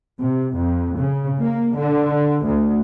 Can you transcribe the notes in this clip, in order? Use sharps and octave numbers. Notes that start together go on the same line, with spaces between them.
C3
F2
C#3
A#3
D3
D2